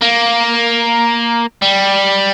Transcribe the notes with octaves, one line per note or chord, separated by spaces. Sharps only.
A#3
G3